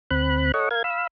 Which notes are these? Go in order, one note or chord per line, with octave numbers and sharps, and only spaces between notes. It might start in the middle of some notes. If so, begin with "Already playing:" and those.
D2 C4 B5 F#6
A4 C#5 D#5 F#5 C#6
A#4 F5 G#6
F5 B5 E6